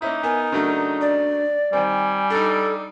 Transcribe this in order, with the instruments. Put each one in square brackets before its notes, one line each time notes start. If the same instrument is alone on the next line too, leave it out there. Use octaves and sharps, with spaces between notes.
[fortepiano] A#3 C#4 E4 [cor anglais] D#4
[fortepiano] B3 [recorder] A#4 [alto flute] G#5
[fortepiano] C#3 F#3 A3 [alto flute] D4
[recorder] D5
[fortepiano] D#3 C4 [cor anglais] G3 [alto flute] G#5
[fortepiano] D4 D#4 [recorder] A4